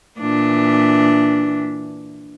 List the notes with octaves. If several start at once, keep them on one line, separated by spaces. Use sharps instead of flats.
A#2 E3 D4